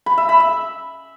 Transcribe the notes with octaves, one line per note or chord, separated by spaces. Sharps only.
B5
E5
B5
E5